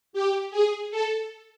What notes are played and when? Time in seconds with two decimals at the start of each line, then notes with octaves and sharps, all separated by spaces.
0.13 G4
0.51 G#4
0.91 A4